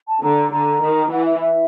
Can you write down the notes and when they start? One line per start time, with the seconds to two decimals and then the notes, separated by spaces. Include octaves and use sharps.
0.08 A5
0.22 D3 A#5
0.52 D3 A#5
0.83 D#3
1.11 E3 F#5
1.26 E5
1.41 E5